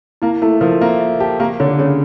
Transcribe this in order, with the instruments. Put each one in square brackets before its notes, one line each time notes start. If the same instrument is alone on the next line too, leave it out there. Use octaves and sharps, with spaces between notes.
[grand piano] A#3 [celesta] E4
[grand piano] A3 [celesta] E4
[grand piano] F3 [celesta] A#4
[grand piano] A#3 [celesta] E5
[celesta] E5
[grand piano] G4 [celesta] A5
[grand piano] A#3 [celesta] G4
[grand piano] D3 [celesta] C#5
[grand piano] C#3 [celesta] C#5